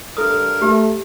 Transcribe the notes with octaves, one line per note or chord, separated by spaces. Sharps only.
G2 A4 A#4 D#6
A3 G4